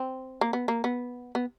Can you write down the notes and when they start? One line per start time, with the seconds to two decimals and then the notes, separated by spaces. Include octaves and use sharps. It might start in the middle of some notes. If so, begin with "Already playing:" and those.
Already playing: C4
0.41 A#3
0.53 B3
0.68 A#3
0.84 B3
1.35 B3